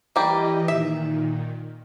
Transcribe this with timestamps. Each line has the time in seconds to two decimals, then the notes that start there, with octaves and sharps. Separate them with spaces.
0.16 E3 G3 A#3 G4 D#5
0.68 A#2 D#3 E5